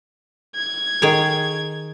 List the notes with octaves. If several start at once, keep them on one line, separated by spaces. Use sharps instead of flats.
G#6
D#3 G#4 C#5